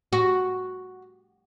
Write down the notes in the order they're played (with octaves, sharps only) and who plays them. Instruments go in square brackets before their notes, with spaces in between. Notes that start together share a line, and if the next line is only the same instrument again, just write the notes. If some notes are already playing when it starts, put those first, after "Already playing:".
[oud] F#4